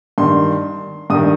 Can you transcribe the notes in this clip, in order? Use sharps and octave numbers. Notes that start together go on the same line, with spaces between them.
G2 D#3 C6
G2 D#3 D#6